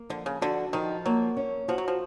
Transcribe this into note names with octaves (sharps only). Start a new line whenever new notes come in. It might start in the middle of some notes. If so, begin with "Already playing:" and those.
Already playing: A#3
D3 F3
C#3
D3 F#4
D#3 F3
F#3 A#3
C#4
F3 F#4
F#3
F3